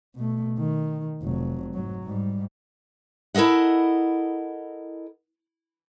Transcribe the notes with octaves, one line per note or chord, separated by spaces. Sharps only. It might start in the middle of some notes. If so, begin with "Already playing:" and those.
B2 A3
D#3
F1 F#3
G#2 F#3
G#2 G3
E4 A4 A#4 D#5 F#5